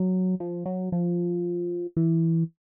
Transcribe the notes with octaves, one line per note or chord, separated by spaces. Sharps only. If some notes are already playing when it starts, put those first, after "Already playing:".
Already playing: F#3
F3
F#3
F3
E3